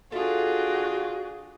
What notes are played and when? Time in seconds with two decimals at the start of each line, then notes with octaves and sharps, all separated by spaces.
0.12 D4 F4 F#4 G#4 A4 E5